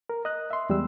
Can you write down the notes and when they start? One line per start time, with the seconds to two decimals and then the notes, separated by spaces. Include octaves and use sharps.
0.10 A#4
0.25 D#5 F#6
0.51 E5 C6
0.69 E2 G3 G#3 E6